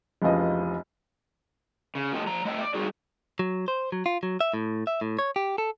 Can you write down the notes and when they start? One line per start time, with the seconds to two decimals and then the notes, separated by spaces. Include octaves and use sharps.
0.22 F1 C#2 E3 F3 D#5
1.95 C#3
2.12 F2 F3 A3 G4 D#5 A5
2.27 F3 A#5
2.45 A3 D#5 E5 G5
2.61 D5
2.74 G3 D#4 F#4 G#4
3.39 F#3
3.68 C5
3.92 F#3
4.06 F4
4.23 F#3
4.41 E5
4.54 A2
4.87 E5
5.01 A2
5.19 C#5
5.36 G4
5.58 A4